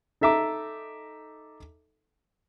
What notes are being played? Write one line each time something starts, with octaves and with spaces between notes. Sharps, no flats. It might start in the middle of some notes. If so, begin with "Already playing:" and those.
D#4 A4 E5 A#5 D6